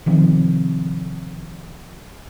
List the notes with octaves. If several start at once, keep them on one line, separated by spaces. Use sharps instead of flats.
C3 D#3 F3 C4